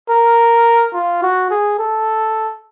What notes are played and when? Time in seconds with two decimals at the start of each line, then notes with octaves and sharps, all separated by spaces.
0.09 A#4
0.94 F4
1.22 F#4
1.50 G#4
1.79 A4